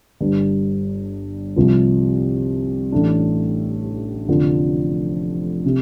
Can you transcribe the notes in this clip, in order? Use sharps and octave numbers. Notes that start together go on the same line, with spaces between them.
G1 G2 G3
C2 C3 F3
A1 A2 A3 D4
F1 F2 D3 F3
C3